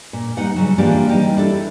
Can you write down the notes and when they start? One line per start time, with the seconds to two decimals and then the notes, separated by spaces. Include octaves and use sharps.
0.13 A#2
0.37 G3 D#4 F#5
0.56 C#3 F#3
0.78 E3 F3 A#3 D4 G4 D5
1.09 G3 D#4 G4
1.37 D4 E4 A4